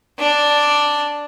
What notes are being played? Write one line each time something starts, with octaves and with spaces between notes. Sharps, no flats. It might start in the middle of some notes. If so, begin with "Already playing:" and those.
D4 D5